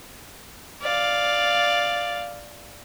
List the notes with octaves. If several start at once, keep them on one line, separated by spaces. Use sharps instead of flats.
D5 F5